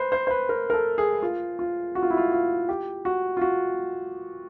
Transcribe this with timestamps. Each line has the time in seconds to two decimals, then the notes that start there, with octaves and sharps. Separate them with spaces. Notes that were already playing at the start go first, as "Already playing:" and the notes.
Already playing: B4 C5
0.12 C5
0.27 C5
0.30 B4
0.49 A#4
0.70 A#4
0.73 A4
0.98 G#4
1.23 F4
1.59 F4
1.95 F#4
2.03 F4
2.10 E4
2.17 F4
2.32 F4
2.69 G4
3.05 F#4
3.37 F4
3.41 F#4